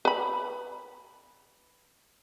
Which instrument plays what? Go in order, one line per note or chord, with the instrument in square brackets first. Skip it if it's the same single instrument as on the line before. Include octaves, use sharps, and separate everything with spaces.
[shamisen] B4 B5